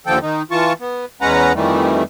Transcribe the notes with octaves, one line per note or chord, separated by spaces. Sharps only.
D#2 D3 F3 A4 G5
D#3 D#4
E3 F4 A5 C#6
B3
E2 G#3 C#4 B4 F#5 A#5
F2 D#3 E3 G3 A3